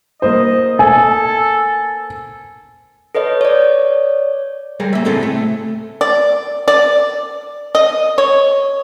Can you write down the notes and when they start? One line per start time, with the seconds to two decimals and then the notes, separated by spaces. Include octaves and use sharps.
0.22 A#3 C5 D#5
0.79 A4 G#5
3.15 A4 B4 C#5 D#5
3.41 C#5 D5
4.80 G3 G#4 A#4
4.93 A#3 E5
5.05 C#2 A2 C4 G#4 A4
5.23 A3
6.01 D5
6.68 D5
7.75 D#5
8.18 C#5